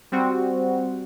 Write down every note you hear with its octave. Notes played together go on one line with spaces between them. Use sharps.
G3 C4 F#4